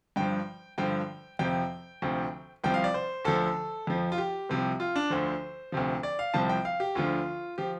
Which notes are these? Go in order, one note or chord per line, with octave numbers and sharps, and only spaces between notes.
G2 F3 G5
G2 D3 F3 G5
F2 C3 F3 G5
D2 C3 F3
C2 C3 F3 G5
F5
D5
C5
D2 D3 F3 A4
F2 F3
F4
G4
C2 C3 F3
F4
D4
D2 D3 F3 C5
D2 C3 F3
D5
F5
C2 C3 F3 A5
G5
F5
G4
D2 D3 F3 F4
F3 G4